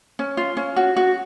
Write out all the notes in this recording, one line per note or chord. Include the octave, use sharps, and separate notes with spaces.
C#4
F4
C#4
F#4
F#4